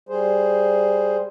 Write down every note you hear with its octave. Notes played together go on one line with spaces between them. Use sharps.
G3 G#4 C5